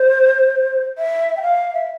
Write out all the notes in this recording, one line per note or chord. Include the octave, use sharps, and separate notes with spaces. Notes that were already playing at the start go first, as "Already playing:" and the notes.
Already playing: C5
E5
G5
F5
E5